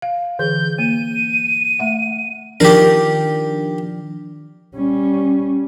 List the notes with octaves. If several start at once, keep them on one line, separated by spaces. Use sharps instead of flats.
F5
D3 E3 G#4 G6
A#3 D#7
A3 E5 F#5
D#3 F3 D4 G4 A#4
G3 C#4